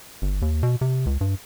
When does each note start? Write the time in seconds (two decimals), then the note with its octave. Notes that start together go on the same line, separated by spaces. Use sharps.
0.22 G1
0.42 D#2
0.63 B2
0.81 C3
1.06 C#2
1.21 G2